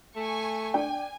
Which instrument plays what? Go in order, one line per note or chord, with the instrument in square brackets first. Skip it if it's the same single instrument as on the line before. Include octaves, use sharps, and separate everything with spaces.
[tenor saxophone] A3 [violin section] G#5 C#6
[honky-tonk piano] D4 G5 [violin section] G#5